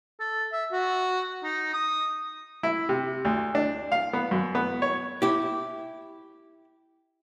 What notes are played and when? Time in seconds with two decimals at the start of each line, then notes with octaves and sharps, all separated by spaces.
0.20 A4
0.52 E5
0.72 F#4
1.43 D#4
1.73 D#6
2.63 E4
2.89 C3
3.25 D2
3.55 D4
3.92 F5
4.13 B3
4.31 F#2
4.55 B3
4.82 C#5
5.22 E4 G4